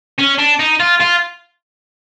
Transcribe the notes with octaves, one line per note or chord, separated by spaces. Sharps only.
C#4
D4
D#4
F4
F4